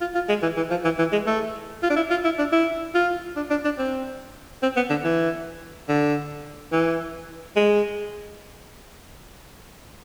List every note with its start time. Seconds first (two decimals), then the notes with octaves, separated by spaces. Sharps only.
0.01 F4
0.15 F4
0.29 G#3
0.43 E3
0.57 E3
0.71 F3
0.85 E3
0.99 E3
1.12 G#3
1.26 A3
1.83 F4
1.90 D4
1.96 E4
2.11 F4
2.24 E4
2.38 D4
2.52 E4
2.95 F4
3.36 D4
3.50 D4
3.65 D4
3.79 C4
4.63 C4
4.77 B3
4.90 D3
5.04 E3
5.89 D3
6.72 E3
7.57 G#3